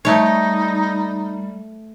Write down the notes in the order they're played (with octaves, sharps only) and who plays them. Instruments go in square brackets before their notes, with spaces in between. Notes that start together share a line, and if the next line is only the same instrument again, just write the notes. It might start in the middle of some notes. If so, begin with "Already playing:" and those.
[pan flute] G3 [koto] A3 C#5 [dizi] D#4